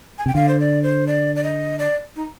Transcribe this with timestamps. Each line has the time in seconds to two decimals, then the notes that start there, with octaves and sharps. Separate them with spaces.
0.18 G#5
0.26 C3 G5
0.35 D3 F5
0.49 C5
0.60 D5
0.83 C5
1.07 D5
1.36 D5
1.44 D#5
1.79 D5
2.16 D#4